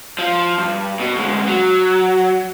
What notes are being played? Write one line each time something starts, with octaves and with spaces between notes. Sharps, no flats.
F3
G2
B2
D2 G#3
F#3